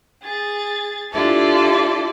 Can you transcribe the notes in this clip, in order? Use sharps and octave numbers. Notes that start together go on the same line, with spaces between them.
G#4 A6
D4 E4 F4 G4 A4 D5